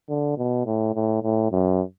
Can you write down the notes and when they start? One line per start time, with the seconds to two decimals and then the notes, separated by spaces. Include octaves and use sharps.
0.09 D3
0.37 B2
0.66 A2
0.95 A2
1.23 A2
1.52 F#2